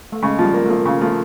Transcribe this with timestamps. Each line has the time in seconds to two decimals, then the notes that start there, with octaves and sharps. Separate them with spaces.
0.12 A3
0.22 C#3 G#3
0.39 F3
0.44 G3
0.54 A#3
0.65 F3 A3
0.85 C#3 A#3
1.01 F3 A3